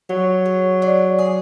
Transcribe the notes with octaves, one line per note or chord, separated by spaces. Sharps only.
F#3 C#5
G#4
D4
G#4